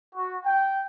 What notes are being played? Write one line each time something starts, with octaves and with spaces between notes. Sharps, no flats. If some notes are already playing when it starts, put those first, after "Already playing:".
F#4
G5